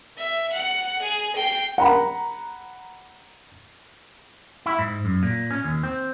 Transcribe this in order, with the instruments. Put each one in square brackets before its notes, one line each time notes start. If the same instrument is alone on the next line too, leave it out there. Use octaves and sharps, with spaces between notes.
[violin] E5
F#5
G#4
G5 C7
[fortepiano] F#5 A#5 B5
[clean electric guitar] E4
G#2
F#2
A#2
C#4
D#2
C4